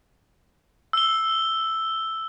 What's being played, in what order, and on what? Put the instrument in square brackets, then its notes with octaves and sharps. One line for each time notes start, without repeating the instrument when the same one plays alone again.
[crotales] E6 G7